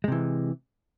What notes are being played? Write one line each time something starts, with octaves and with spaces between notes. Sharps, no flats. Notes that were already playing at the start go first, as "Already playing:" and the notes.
C3 E3 G#3